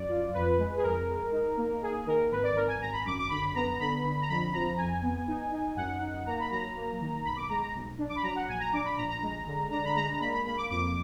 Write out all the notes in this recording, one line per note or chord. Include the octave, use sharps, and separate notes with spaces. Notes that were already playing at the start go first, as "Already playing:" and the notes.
Already playing: F#2 D5
F4
F2 B4
G#3
G#4
F2 A#4
G#3
D#4
A#3
A#3 G#4
D#3 A#4
G#1 B4
D5
G#1 A#4
G#5
G#1 A#5
B5
F#2 D6
D6
D3 B5
B3 A#5
D3 B5
D3
A#5
F2 B5
F3 A#5
F2 G#5
B3
D#4
D#4
F#2 F#5
D#4
A#3 A#5
B5
F#3 A#5
A#3
D#3
B1 B5
D6
G#3 A#5
A#5
B1
D4
D6
B5
F#3 A#5
F#5
A#1 G#5
A#5
D4 D6
B5
A#1 A#5
A#5
G#3
D3
D4 A#5
B5
G#3 A#5
A#5
A#3 B5
B5
A#3 B5
D6
F2 D6